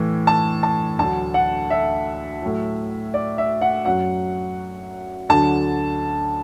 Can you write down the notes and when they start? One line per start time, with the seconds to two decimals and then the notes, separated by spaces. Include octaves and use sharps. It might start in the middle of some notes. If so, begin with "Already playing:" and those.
Already playing: A2 E3
0.27 A5
0.63 A5
0.99 D2 D3 F#3 A5
1.34 F#5
1.70 E5
2.42 A2 F#3
3.14 D5
3.38 E5
3.61 F#5
3.85 F#2 F#3 F#5
5.29 D2 D3 F#3 A5